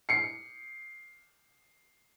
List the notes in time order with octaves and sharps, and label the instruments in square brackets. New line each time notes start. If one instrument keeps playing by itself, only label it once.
[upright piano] C7 C#7